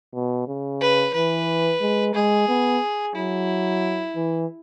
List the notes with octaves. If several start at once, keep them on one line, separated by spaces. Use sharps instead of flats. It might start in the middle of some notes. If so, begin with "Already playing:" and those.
B2
C#3
B4
E3 B4
G#3
G#3 G#4
B3
F#3 E4
E3